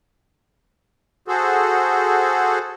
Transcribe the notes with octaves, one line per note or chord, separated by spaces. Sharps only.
F#4 G#4 A4 C5